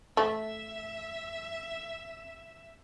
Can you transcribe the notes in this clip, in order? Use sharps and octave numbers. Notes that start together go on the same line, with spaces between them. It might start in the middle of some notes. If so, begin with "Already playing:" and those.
A3 E5